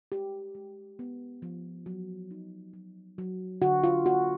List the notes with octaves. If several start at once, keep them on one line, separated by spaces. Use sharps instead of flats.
G#3 G4
G#3
B3
F3
F#3
D#4
F#3
F#3
D3 F#4
F4
A#3 F#4